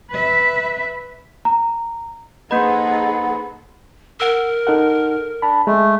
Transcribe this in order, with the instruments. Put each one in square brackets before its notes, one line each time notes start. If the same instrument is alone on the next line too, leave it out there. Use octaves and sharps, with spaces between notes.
[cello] B4 E5
[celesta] A#5
[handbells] A#3 D#5 [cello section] D#4 G#4 A4 [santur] B4 C5 [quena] F#5
[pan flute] A#4 [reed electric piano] F#5 E6
[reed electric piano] D#4 A4 F#5
[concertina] D4 [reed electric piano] A5 B5
[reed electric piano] G#3 [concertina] A3